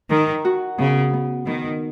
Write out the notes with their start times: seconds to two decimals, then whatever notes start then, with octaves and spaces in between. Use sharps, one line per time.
0.10 D#3 A#4
0.45 F#4
0.78 C#3 B3
1.13 B3
1.46 D#3 B3